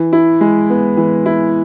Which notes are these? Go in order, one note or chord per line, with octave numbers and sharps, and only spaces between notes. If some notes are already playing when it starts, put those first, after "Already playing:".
Already playing: E3
E4
G#3
B3
E3
E4